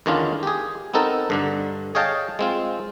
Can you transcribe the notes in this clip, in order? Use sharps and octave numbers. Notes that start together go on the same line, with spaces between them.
E2 D3 D#3 C#4 D4 F4
G4 G#4
B3 C4 D#4 A4 A#4
G2 D3 D4
G#4 C#5 D#5 F5 G5 A5
G#3 C4 F4